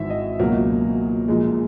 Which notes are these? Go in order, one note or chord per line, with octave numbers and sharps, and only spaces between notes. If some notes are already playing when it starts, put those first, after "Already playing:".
Already playing: G#1 G#2 E3 E5
D#5
C#2 B2 F#3 A#3
A#1 A#2 G#3